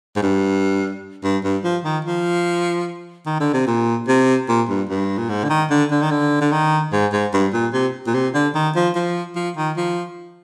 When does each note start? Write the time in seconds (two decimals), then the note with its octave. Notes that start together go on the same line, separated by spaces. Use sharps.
0.16 G#2
0.22 G2
1.23 G2
1.44 G2
1.64 F3
1.84 D#3
2.05 F3
3.26 D#3
3.40 D3
3.53 C3
3.67 A#2
4.08 C3
4.48 A#2
4.69 G2
4.89 G2
5.18 A#2
5.29 G#2
5.44 D3
5.50 D#3
5.70 D3
5.91 D3
6.02 D#3
6.11 D3
6.41 D3
6.52 D#3
6.92 G#2
7.13 G#2
7.33 G2
7.53 A#2
7.73 C3
8.07 A#2
8.14 C3
8.34 D3
8.55 D#3
8.76 F3
8.95 F3
9.36 F3
9.57 D#3
9.77 F3